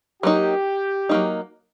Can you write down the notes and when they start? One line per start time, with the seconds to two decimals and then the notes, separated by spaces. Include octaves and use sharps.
0.23 F#3 A#3 D#4 G4
1.09 F#3 A#3 D#4